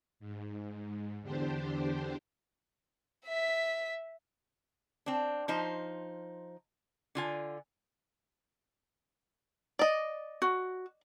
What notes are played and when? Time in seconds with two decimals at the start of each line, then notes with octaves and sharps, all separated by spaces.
0.20 G#2
1.22 E2 D3 D4 G4 C5
3.26 E5 B6
5.06 C4 D4
5.48 F3 D#4 C5
7.15 D3 F4 G#5
9.79 D5 D#5
10.42 F#4